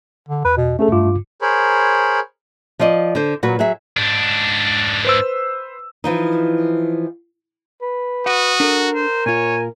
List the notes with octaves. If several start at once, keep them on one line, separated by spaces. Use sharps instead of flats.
D3
E2 B4
B2
A3 C#4 G#4 A4
G2 F4 D6
G#4 A#4 C5 C#5 B5
F3 C5 D5 D#5
D3 C5
A#2 F#3 F#4 B4
F#3 G#4 E5
G#2 D4
B4 C5 E6
E3 F3 D#4
B4
F#4 F#5 D#6
D4 A4 A#4
C5
A#2 F4 C#5 G#5